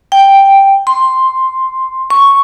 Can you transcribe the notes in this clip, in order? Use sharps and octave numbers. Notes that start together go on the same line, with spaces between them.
G5
C6
C#6